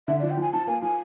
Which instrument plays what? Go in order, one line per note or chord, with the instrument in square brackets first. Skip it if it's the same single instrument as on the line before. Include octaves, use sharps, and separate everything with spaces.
[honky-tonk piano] D3 [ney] E5
[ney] D5
[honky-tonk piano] F3
[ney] G5
[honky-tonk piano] F3 [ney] G#5
[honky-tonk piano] F3 [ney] A5
[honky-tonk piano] A#3 [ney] G#5
[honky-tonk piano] F3 [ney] G#5